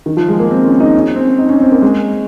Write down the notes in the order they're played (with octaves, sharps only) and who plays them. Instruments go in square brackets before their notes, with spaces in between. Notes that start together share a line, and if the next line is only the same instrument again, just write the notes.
[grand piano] D#3
F3
G#3
A#3
C4
C#4
D#4
C#4
C4
D#4
C#4
C4
A#3
G#3